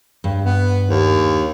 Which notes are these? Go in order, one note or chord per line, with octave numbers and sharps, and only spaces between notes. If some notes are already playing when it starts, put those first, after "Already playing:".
G2
B3
D#2